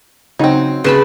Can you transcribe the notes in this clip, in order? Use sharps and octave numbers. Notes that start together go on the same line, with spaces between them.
C#3 F#3 C4 D#4
C#3 B4 A5 B5